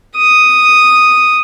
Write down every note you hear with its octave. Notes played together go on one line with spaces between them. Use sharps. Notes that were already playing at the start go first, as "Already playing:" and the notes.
D#6